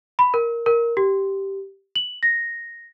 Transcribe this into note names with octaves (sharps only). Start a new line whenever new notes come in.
B5
A#4
A#4
G4
F#7
A#6